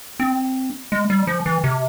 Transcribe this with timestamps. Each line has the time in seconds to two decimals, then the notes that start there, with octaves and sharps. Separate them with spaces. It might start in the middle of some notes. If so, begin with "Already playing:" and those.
0.20 C4
0.92 G#3
1.10 G3
1.27 F3
1.46 E3
1.64 C3